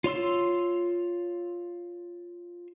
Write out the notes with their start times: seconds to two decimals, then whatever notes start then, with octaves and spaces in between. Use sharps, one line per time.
0.04 F4 C#5 C6 E6